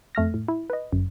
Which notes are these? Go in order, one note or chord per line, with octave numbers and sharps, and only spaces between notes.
F2 A3 F6 A#6
A2
E4
B4 D#5
G1 F#2